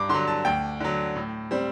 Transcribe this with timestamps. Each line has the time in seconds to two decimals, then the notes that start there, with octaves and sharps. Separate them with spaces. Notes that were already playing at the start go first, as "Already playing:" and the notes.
Already playing: G2 D6
0.09 D3 F#3 C6
0.27 A5
0.45 D2 G5
0.80 D3 F#3
1.16 A2
1.51 G3 C4